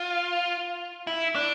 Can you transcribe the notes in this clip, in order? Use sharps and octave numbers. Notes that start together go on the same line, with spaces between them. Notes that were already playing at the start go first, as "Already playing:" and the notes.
Already playing: F4
E4
D4